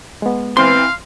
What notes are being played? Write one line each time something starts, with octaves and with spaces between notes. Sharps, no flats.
G#3 B3
E3 C4 F5 C6